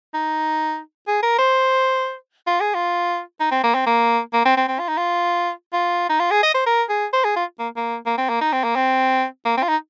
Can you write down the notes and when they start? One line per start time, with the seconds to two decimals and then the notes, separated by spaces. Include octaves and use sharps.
0.14 D#4
1.08 G#4
1.23 A#4
1.39 C5
2.47 F4
2.61 G#4
2.75 F4
3.41 D#4
3.51 C4
3.64 A#3
3.75 C4
3.87 A#3
4.33 A#3
4.46 C4
4.57 C4
4.68 C4
4.80 F4
4.89 D#4
4.98 F4
5.73 F4
6.10 D#4
6.20 F4
6.31 G#4
6.43 D#5
6.54 C5
6.67 A#4
6.90 G#4
7.13 C5
7.25 G#4
7.36 F4
7.59 A#3
7.77 A#3
8.06 A#3
8.18 C4
8.29 A#3
8.41 D#4
8.53 C4
8.64 A#3
8.76 C4
9.46 A#3
9.58 C4
9.63 F4
9.69 D#4